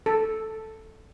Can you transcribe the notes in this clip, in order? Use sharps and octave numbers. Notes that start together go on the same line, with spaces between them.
A4